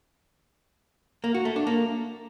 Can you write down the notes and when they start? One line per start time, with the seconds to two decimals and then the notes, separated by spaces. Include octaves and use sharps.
1.24 A#3
1.34 F#4
1.45 A3
1.56 D4
1.67 A#3